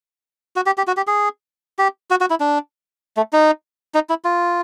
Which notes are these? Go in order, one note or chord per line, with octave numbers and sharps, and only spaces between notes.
F#4
G4
G4
F#4
G4
G#4
G4
F#4
F#4
E4
D4
A3
D#4
D#4
E4
F4